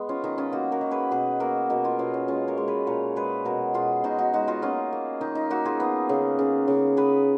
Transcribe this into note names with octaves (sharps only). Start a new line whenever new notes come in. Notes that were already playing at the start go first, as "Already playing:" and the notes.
Already playing: G#3 B3
C#4 F4
D#3 D#4
C#4 F4
A#3 D#4 F#4
F#4 A#4
D#3
G#4 B4
B2 G#4 B4
A#3 F#4 A#4
B2 F#4 A#4
F4 G#4
B2 C#4 F4
C#4
G#3 C#4 F4
A#4 C#5
G#3
G#4 B4
A#2 A#4 C#5
G#3 G#4 B4
B2 F#4 A#4
B2 F4 G#4
B2 D#4 F#4
D#4 F#4
G#3 D#4 F#4
F4 G#4
A#3 C#4 F4
A#3
D#3 D#4
D#4
A#3 D#4 F#4
F4 G#4
B3
C#3
C#3
C#3
B3 G#4 B4